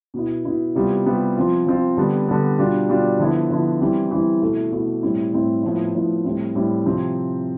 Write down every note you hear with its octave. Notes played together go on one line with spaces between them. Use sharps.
B2 B3 E4
B2 B3 E4
C3 G3 B3 F4
C3 G3 B3 F4
F3 C4 F4
F3 C4 F4
D3 G3 B3
D3 G3 B3
B2 G3 D4 F4
B2 G3 D4 F4
D3 F3 B3 E4
D3 F3 B3 E4
E3 G3 C4 E4
E3 G3 C4 E4
B2 A3 E4
B2 A3 E4
A2 G3 C4 E4
A2 G3 C4 E4
A2 F3 B3 E4
A2 F3 B3 E4
A2 G3 C4 E4
A2 G3 C4 E4
C3 F3 C4